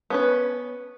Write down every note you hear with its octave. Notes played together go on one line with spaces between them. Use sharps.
B3 C#4 B4